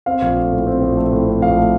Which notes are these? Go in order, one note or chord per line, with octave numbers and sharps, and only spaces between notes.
C4 F5
A#1
A3
A2
C4
A#1
A3
A2
C4
A#1 F5
A3